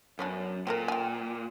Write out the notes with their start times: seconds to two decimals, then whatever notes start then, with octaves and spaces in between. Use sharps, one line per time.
0.19 F#2 B3 C#4 D4
0.67 A#2 C4 A4 A#4
0.88 G5 G#5